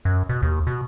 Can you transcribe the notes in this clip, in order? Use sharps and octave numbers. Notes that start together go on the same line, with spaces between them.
F#2
B2
D#2
B2